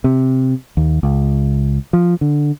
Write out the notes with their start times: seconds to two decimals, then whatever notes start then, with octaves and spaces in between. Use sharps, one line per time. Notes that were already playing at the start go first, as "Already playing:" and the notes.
0.04 C3
0.77 D#2
1.03 C#2
1.93 F3
2.21 D3